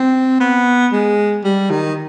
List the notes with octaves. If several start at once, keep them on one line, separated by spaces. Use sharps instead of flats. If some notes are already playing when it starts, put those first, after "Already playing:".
Already playing: C4
B3
G#3
G3
D#3